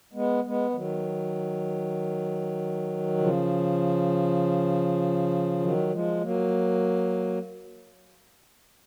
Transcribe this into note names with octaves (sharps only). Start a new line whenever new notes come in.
G#3 B3
G#3 B3
G#3
D#3 F#3
C#3 F3
D#3 F#3
F3 G#3
F#3 A#3